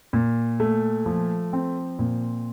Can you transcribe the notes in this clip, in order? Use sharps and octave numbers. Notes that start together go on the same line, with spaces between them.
A#2
A3
F3
C4
A#2